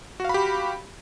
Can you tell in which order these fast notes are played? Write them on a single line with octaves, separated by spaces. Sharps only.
F#4 F5 B5 G4